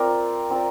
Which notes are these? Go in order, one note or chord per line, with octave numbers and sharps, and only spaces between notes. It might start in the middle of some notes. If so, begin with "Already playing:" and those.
Already playing: C4 F4 A#4 D5
C4 F4 A#4 D5